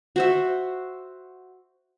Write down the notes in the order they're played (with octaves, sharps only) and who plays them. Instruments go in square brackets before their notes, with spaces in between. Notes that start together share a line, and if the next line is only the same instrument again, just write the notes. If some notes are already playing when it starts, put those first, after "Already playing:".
[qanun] F#4 C5 E5